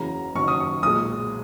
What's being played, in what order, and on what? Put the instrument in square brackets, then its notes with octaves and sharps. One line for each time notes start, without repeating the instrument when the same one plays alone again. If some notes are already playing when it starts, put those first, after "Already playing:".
Already playing: [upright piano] F#1 E2 C#3 F#3 A#5
F#1 F#2 D#3 F#3 C#6
D#6
C#6
B1 A#2 G#3 D#6